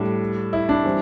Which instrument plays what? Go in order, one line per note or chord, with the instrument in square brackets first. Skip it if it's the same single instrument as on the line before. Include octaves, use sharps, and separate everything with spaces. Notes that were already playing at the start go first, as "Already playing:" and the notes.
Already playing: [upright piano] A2 G3 D4
[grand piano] E4
D4
[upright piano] E3 G3 C4